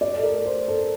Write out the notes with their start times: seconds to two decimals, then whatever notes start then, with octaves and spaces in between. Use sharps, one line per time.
0.01 D5
0.17 A4
0.23 A#4
0.46 C5
0.68 A4